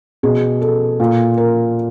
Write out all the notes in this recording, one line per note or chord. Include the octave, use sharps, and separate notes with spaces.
B2 G#4
A4
A#2
A#4